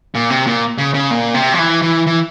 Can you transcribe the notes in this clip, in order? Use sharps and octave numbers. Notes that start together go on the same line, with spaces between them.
A#2
C3
A#2
C#3
C#3
A#2
C3
F3
E3
E3
E3